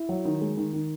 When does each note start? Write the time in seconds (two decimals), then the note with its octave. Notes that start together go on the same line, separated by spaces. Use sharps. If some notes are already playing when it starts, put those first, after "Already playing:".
Already playing: E4
0.09 F#3
0.25 D#3
0.41 G#3
0.57 D#3
0.73 D#3